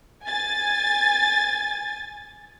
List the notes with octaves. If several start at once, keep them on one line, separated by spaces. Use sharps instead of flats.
G#5 A6